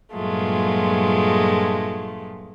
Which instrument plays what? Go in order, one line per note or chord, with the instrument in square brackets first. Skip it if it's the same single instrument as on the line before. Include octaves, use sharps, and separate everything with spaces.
[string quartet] G2 A#2 F#3 G#3 A3 F4